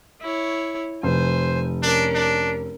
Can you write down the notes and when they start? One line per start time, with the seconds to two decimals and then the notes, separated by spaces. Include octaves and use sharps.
0.21 E4 C#5
1.03 F1 C5 G#5
1.83 C#4 D4 A#4
2.15 D4